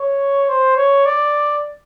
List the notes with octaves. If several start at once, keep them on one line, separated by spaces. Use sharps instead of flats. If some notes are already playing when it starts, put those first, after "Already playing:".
Already playing: C#5
C5
C#5
D5